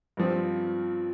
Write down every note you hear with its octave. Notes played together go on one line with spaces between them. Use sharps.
G2 F3 C4